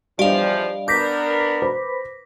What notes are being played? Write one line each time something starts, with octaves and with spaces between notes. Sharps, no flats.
E2 F3 G3 D4 G4 D5 D#5 F5
B3 D4 A#4 D6 G6 A#6 B6
B4 C5 B5